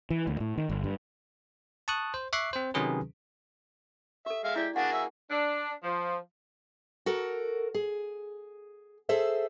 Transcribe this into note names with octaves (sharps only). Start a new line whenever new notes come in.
E3
D2
A2
D#3
G1
G2
A5 C#6 D#6 F#6
C5
E5 C#6 D6 F#6 C7
C4 C5
C3 D#3 F#3 C#4 G#4 B4
G4 A4 E5
G#3 E5 F5
E4 G4 D5
A#3 D4 F#4 G#4 F5 F#5
E5
D4
F3
F#4 A4 A#4
G#4
G#4 A4 C5 E5